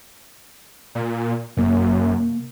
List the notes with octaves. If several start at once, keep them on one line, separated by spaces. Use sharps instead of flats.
A#2
F#2 C3 A#3